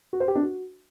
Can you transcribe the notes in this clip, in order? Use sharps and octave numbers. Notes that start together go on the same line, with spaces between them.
F#4
C5
G4
D4
F#4